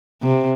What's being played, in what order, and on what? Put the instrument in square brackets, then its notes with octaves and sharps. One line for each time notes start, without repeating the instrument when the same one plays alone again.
[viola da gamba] C3